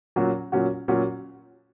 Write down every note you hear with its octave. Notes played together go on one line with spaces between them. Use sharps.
A#2 F#3 C#4 F#4
A#2 F#3 C#4 F#4
A#2 F#3 C#4 F#4